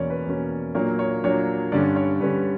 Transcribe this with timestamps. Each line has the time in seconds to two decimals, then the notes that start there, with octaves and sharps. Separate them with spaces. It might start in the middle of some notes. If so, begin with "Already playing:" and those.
Already playing: E2 B2 A#3 C#4 C#5 D5
0.10 B4
0.26 E2 B2 A#3 C#4
0.75 A#2 F#3 A#3 D4 C#5
0.99 C#5
1.24 A#2 F#3 A#3 D4 C#5
1.72 G2 D3 G3 C#4 D5
1.96 C#5
2.20 G2 D3 G3 C#4 B4